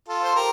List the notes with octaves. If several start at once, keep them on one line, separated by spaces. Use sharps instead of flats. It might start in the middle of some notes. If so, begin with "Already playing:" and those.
F4 A4
C5
G4 A#4